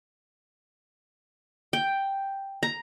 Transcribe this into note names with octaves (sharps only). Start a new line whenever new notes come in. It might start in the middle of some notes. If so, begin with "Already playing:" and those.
G5
A#5